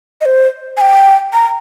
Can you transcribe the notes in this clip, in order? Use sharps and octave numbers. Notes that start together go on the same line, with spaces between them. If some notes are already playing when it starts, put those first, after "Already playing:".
D#5
C5
G#5
G5
A#5